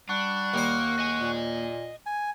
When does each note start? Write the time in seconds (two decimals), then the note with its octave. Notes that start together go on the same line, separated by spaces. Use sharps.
0.09 G3 D4 F#5 C#6
0.54 D#2 A#3 C5
0.99 D#5 G#5
1.21 A#2
2.06 G#5